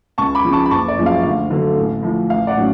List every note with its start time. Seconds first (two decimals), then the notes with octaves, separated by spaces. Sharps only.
0.18 C#2 A5 C#6
0.35 B5 D6
0.45 C#3 F3
0.52 A5 C#6
0.66 B5
0.71 F#1 A5 C#6
0.88 D5
0.98 F#2 F3 G#3
1.06 F5
1.23 D2 F5
1.50 D3 F#3 A3
1.77 A1
2.03 A2 F3
2.30 A1 F5
2.47 D5 F#5
2.57 A2 F#3 C#4